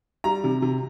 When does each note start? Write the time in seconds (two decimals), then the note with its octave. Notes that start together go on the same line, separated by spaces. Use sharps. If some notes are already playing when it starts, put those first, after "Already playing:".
0.24 G3 A#5
0.44 C3
0.62 C3